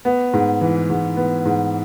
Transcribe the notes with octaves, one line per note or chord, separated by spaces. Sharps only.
B3
G#2
E3
G#2
B3
G#2